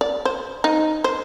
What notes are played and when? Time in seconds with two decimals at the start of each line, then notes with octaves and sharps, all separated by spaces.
0.01 D5
0.25 C5
0.64 D#4
1.04 C5